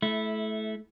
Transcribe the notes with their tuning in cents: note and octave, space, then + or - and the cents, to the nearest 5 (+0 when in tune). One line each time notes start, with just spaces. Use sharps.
A3 -25 E4 +0